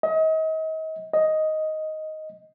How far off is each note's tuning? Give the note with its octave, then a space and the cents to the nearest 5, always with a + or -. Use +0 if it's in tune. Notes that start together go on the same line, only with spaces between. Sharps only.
D#5 +35
D#5 +5